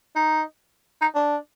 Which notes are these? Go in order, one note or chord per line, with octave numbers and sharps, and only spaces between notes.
D#4
D#4
D4